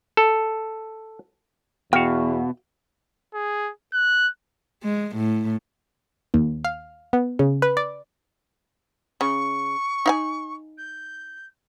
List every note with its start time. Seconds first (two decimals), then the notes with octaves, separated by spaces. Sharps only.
0.17 A4
1.93 E2 B2 F#4 F5 G5
3.34 G#4
3.93 F#6
4.83 G#3
5.16 A2
6.34 D#2
6.65 F5
7.13 B3
7.39 C#3
7.62 B4
7.77 D5
9.21 C#3 C#6
10.06 D#4 F5 G#5
10.78 G6